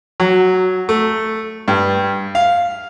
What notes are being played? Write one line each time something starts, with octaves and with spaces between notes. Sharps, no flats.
F#3
A3
G2
F5